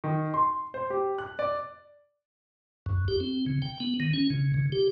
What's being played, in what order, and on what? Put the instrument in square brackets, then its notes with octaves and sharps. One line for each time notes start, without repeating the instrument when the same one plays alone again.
[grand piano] D#3
C6
C5
G4
F#6
D5
[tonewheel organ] F#2
G4
C4
C#3
G5
B3
D#3
C#4
C#3
C#3
G4